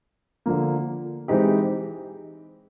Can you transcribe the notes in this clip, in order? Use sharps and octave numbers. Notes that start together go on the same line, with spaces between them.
D3 F3 A#3
E3 G#3 C4 D#4 G4